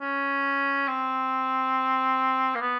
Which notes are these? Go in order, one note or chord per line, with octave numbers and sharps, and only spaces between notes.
C#4
C4
A#3
B3